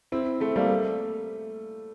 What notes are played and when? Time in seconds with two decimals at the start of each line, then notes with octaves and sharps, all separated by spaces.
0.12 C4 E4
0.41 A3 C4
0.56 G3 A#3
0.70 A3